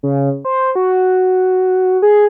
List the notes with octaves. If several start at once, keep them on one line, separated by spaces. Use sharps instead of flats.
C#3
C5
F#4
G#4